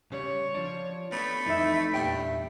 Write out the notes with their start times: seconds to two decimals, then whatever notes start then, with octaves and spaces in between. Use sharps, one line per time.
0.12 C#3 G3 C#5
0.55 F3 D4
1.12 A3 B3 D4 B5
1.46 F2 G#2 E3 D#4 E5
1.94 E2 G2 A#2 E5 G5